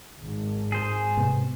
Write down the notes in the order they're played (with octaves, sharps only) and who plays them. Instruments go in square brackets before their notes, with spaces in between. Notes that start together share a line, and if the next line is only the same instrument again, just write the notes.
[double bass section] G#1
[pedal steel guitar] G#4 C5
[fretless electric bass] G#2 C3 B3